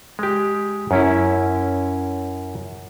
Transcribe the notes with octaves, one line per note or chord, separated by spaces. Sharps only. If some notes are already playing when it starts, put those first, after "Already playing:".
G#3 G4
F#2 C#4 E4